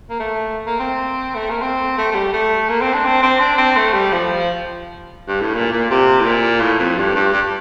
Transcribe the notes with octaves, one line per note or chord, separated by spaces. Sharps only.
A#3
A3
A#3
C4
A3
A#3
C4
A3
A3
G3
A3
A#3
C4
D4
C4
C4
D4
C4
A3
G3
F3
G2
A2
A#2
A#2
C3
A2
A#2
A2
F2
G2
G2
G2